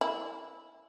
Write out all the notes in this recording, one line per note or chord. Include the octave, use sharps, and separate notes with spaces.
E4